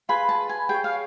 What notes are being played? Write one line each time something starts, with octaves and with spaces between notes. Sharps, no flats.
F4 G#4 B4 B5
A5
G#5
G#4 C#5 G5
F5